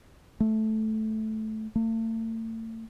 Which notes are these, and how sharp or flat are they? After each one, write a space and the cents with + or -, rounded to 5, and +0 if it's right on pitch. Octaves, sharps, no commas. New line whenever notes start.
A3 -10
A3 +40